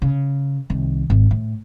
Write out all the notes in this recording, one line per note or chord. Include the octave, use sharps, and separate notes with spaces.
C#3
C2 D#3
G#1
A2